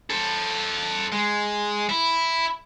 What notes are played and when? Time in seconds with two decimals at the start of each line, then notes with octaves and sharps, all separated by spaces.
0.10 A4 C5
1.12 G#3
1.89 E4